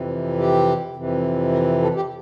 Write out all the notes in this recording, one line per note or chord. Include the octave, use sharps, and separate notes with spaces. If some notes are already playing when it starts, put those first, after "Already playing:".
Already playing: F2 C3 E3
G4
F2 C3 E3
A#4
A4
G4